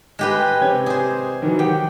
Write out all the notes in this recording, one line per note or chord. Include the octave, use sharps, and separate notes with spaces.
G#3 G4 B4
C3 C#5 G#6
G#4 C5
D#3 E3 F#3
G4 F#5 G5